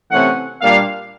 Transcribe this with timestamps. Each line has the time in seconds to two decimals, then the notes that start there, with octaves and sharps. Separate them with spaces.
0.11 C3 E3 A3 C#4 F#5
0.61 A#2 G3 A#3 D4 F5